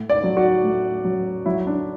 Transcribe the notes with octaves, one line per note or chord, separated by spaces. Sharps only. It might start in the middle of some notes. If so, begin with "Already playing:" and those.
Already playing: A2
D5
F#3
F#4
A2
F#3
F#3 E4
D4